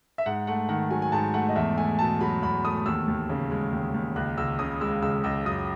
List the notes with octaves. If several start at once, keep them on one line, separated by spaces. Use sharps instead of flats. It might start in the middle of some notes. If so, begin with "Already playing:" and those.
E5
G#2 F#5
A3 F#5
D#3 F#5
F#3 G#5
G#5
G#2 A5
A3 F#5
D#5
E2 E5
A3 G#5
B2 A5
F#3 B5
E2 B5
A3 D#6
D#2 E6
D#2
C#3
G#3
D#2
D#2
C#2 F#6
C#2 E6
C#3 D#6
G#3 E6
C#2 E6
C#2 E6
F#2 D#6